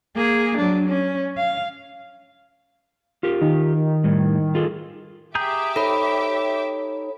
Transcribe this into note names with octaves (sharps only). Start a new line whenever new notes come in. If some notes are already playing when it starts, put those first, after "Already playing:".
A#3 G#4
F#3 D4
C#4
F5
F4 G4 A#4
D#3
A2 G3
F4 G#4 A4
G4 G#4 E5 A#5 D6 G6
D#4 A4 C5 C#5 B5